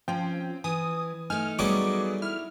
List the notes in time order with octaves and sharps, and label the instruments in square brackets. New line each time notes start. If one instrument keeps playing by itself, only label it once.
[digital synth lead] F3 [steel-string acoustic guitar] C4 C#4 [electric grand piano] G5
[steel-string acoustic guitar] E3 [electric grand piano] G#5 [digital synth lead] D#6
[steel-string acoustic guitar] A3 D#4 [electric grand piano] G#5 [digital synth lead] F6
[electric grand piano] F#3 B3 G#4 [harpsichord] G3 C#4 C#5 [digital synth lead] D6
[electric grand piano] E4 [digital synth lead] F6